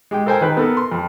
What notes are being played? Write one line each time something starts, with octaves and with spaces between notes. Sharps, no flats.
G#3 G4 G5
A4 A#4 C5 G5 G#5
D#3 B4 F#6
B3 A4 A#4
C6
F2